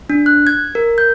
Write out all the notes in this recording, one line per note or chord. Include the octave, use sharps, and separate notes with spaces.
D4
F#6
G#6
A#4
G6